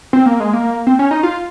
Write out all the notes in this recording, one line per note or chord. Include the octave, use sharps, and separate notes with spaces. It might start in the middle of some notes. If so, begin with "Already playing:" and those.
C4
A#3
G#3
A#3
C4
C#4
D#4
F4